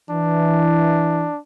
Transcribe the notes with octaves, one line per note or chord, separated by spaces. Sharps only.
E3 D4